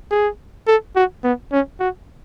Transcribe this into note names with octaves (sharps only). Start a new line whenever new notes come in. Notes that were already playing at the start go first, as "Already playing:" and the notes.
G#4
A4
F#4
B3
C#4
F#4